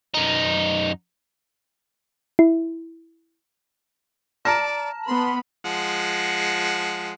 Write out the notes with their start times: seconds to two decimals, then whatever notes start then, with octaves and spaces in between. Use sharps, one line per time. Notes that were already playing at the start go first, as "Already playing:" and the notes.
0.14 F#2 D#4
2.39 E4
4.45 D5 A5 A#5 F6 A#6
5.07 B3 B5 C6
5.65 F3 G#3 F#5